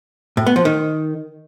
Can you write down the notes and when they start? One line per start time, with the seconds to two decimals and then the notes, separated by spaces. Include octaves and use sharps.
0.37 A2
0.46 B3
0.56 F3
0.65 D#3